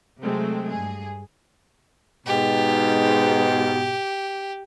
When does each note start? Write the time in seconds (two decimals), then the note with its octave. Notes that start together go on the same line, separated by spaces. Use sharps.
0.21 C3 F#3 G#3 A3 C4
0.71 G2 G#4
2.26 G#2 B2 G4